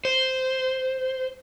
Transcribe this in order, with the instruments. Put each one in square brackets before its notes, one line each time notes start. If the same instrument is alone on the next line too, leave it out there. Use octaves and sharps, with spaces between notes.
[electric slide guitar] C5